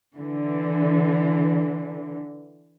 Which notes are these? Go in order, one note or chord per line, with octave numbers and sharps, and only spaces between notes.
D3 E3